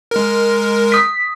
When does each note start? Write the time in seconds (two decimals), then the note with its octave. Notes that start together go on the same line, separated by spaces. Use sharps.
0.11 G#3 A#4
0.92 D#6 B6